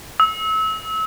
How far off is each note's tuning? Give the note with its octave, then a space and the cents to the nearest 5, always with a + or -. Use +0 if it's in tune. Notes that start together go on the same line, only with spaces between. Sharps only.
E6 -30